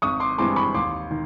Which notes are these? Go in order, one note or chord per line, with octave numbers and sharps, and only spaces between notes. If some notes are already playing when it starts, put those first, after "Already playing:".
G#1 C#6 D#6
C6 D6
G2 E3 G#3 C4 C6 D6
B5 C#6
D#2 C6 D6
D#3